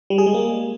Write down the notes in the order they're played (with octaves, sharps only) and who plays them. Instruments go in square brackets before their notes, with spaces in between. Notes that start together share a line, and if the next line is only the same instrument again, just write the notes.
[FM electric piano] G3
G#4
G#3
A#3